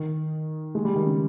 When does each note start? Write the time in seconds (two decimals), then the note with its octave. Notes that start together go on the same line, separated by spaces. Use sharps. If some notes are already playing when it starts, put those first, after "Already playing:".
Already playing: D#3
0.75 G#3
0.85 G3
0.95 D#3
1.06 C#3